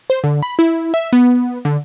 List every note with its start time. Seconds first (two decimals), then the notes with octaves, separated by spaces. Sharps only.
0.10 C5
0.24 D3
0.43 B5
0.59 E4
0.94 E5
1.13 B3
1.65 D3